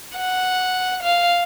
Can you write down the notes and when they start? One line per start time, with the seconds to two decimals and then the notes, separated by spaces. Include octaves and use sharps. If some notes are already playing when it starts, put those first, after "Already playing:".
0.16 F#5
1.03 F5